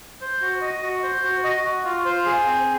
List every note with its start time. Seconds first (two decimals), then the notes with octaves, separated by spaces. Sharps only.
0.21 C5
0.42 F#4
0.61 D#5
0.83 F#4
1.03 C5
1.24 F#4
1.44 D#5
1.65 F#4
1.85 F4
2.05 C5
2.26 G#4
2.46 C4